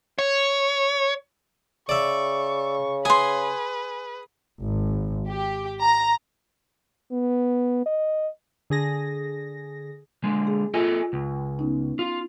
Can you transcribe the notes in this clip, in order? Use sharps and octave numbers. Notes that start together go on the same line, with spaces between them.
C#5
C#3 D5 E5 C#6
G#4 B4 G#5 C6
G#1
G4
A#5
B3
D#5
D3 G#4 A#6
D3 G#3
G#4
F4 A4 D#5 G#5
C#2
B3 C#4 D#4
F4